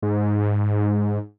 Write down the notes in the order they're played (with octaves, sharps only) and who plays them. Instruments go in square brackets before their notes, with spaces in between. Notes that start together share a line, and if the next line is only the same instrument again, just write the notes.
[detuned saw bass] G#2